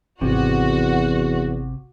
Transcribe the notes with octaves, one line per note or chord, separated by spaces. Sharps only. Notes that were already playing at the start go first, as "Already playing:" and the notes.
G#1 E2 C3 F4 F#4